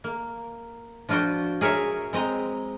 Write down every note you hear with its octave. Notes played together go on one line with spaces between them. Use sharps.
A#3
F3 D4 F4 F#4 G5
G#4 A#4 C#5 E5
G#3 C4 D#5 A#5